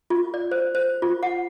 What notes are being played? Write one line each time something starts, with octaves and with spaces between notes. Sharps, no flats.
F4
D5
C5
C5
F4
F#5